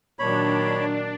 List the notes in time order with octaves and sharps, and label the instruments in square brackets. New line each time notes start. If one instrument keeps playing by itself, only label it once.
[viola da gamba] A#2 D#3 F#3 [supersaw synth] D4 [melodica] C#5 B5